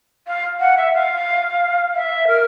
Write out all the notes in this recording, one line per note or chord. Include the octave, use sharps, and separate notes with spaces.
F5
F#5
E5
F5
E5
A#4